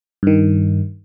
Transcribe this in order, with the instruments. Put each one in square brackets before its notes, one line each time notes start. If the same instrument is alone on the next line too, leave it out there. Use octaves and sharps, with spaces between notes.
[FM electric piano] G2 D#3